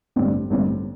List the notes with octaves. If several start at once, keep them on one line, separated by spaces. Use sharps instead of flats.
A1 G2 D3 C4
A1 G2 D3 C4